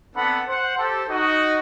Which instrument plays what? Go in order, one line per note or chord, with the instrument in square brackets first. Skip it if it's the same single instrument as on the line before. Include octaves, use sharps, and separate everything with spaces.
[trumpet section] B3 C4 D4 A4 F#5 B5
C5 F#5
G4 A4 C5
D#4 F#4 D#5